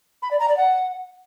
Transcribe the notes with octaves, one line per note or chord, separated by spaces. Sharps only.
B5
D5
A#5
D5
F#5